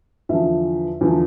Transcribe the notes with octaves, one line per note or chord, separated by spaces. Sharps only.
E2 D3 F3 E5
E2 D3 F3